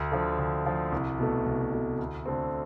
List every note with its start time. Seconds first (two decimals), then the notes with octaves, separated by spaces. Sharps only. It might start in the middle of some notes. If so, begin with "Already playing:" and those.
Already playing: D2
0.12 D3 F3
0.39 D2
0.66 D3 F3
0.92 C2
1.19 B2 A3
1.46 C2
1.72 B2 A3
1.99 D2
2.26 D3 A3 C4